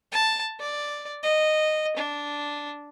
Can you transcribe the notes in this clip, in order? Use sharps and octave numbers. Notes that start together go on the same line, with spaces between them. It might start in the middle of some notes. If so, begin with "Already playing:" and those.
A5
D5
D#5
D4